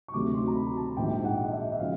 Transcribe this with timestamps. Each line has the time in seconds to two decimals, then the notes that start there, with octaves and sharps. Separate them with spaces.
0.08 C#6
0.14 D2 C3 D#3 F#3 A3 D6
0.35 C6
0.48 A#5
0.55 B5
0.77 A5
0.97 A#1 G#2 D#3 G5
1.25 F#5
1.44 D#5
1.52 E5
1.72 E5
1.80 C#3 F3 G#3 F5